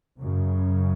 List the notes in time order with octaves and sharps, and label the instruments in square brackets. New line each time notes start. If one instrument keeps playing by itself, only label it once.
[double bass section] F#2 C#3